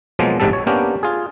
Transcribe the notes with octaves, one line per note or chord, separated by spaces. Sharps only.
B2 F3 F#3 G#3 A#3
A1 G#2 C3 G3 A4
C#5
A#3 B3 C#4 D4 G4 A#4
F4 G#4